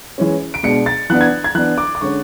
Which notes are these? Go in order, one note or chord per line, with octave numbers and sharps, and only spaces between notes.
E3 G#3 C#4
D7
B2 G#3 D4 C#7
A6
E3 B3 D4 F#6
G#6
G#6
E3 B3 D4 F#6
D6
D6
D3 G#3 C#4 C#6